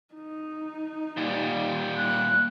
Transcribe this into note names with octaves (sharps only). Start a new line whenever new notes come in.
D#4
A#2 G3
F#6